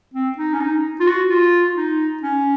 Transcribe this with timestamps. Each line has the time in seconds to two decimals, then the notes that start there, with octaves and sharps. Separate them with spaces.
0.14 C4
0.38 D#4
0.53 C#4
0.60 D#4
1.00 F4
1.07 F#4
1.29 F4
1.76 D#4
2.22 C#4